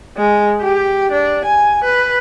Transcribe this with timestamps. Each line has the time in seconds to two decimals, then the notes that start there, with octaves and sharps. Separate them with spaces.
0.17 G#3
0.61 G4
1.12 D4
1.45 G#5
1.84 B4